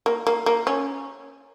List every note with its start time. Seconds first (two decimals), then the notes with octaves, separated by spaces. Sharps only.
0.06 A#3
0.27 A#3
0.46 A#3
0.67 C#4